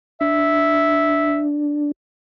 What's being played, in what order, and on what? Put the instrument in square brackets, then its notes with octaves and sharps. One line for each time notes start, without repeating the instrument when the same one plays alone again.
[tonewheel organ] D4 [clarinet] E5